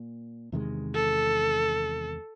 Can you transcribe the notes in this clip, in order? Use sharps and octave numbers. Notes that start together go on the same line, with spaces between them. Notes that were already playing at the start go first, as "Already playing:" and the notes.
Already playing: A#2
E2 C3 D#3 G#3
A4